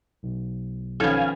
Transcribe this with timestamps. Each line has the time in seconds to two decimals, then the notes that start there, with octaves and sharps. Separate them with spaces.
0.23 B1 B2
1.00 D#3 F3 B3 C#4 A4 F5 G#5